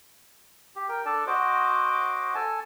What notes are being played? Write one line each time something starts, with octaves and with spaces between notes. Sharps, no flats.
G4
A#4 G5
D4 A4 D5 A5
F#4 C5 D#5 D6
A4 G#5 A5